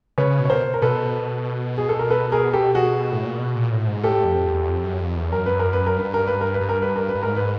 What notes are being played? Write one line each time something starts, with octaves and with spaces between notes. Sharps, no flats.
C#3 B4 C#5
B2
C#5
A#4 C5
A#4
B2 A4 B4
G#4
A4
A#4
A4 B4
G#4 A#4
G4 A4
F#4 G#4
A2
A#2
B2
A#2
A2
G#2
A2 G4 A4
F2
E2
F2
F#2
F2
E2
F#2 A#4
B4
A#4
B4
A#4
G2 B4
A#4
B4
A#4
B4
G2
A#4
B4
A#4
B4
G2
G#2 A#4
B4